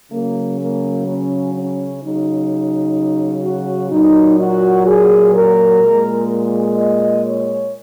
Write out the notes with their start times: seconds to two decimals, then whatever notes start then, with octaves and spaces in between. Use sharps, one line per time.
0.11 C#3 F#3 A#3
0.59 A#3
1.06 C#4
1.53 C#4
2.01 C#3 F#3 D#4
3.43 F#4
3.91 A#2 F#3 D#4
4.39 F#4
4.86 G#4
5.33 A#4
5.81 A#2 G#3
6.75 D#5
7.23 C#5